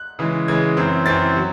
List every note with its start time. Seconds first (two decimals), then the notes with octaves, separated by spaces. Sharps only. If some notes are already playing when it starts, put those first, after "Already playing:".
Already playing: F#6
0.19 C#3 E3 G#3
0.48 C#3 E3 G#3 G#6
0.77 F#2 E3 C4
1.06 F#2 E3 C4 A6
1.37 F#3